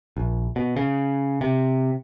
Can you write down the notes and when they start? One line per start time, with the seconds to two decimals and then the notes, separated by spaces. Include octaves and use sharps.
0.17 A#1
0.56 B2
0.76 C#3
1.41 C3